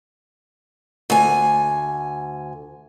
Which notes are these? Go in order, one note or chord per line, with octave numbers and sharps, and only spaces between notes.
D2 G#5